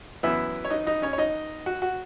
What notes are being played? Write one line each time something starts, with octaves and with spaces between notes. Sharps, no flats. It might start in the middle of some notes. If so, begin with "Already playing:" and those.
F#2 E3 B3 E4 E5
C#5
D#4 D#5
D#4 D#5
C#4 C#5
C#5
D#4 D#5
F#4 F#5
F#4 F#5